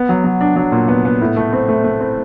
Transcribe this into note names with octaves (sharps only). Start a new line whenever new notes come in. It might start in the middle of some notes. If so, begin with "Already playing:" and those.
Already playing: B3
F#3
F#3
D4
F#3
A#2
B3
B3
A2
A3
C4
A3
A3
C4